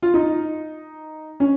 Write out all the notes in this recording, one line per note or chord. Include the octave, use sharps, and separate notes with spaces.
F4
D#4
C#4